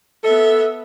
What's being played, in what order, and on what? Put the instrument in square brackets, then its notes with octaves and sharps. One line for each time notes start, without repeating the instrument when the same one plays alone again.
[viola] B3 E5 [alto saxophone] A4